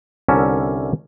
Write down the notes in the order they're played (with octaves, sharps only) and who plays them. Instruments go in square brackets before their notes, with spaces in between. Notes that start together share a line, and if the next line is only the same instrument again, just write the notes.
[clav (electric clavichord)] C2 D3 C#4 A4 A#4 E5